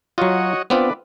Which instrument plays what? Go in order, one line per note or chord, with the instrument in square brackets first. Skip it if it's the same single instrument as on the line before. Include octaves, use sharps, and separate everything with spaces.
[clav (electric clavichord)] F#3 F4 [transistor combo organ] F#4 C#5 D#5
[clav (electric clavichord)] B3 C4 F4 [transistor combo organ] D4 B4